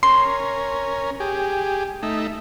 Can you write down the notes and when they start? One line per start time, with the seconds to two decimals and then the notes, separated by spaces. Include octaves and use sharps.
0.03 C#4 A#4 C6
1.20 G4 G#4
2.03 A3 D#4 E5